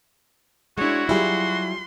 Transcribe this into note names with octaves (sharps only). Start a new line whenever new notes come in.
G#3 D4 E4 F#4 C#5
F#3 G3 E4 F4 G#4 C6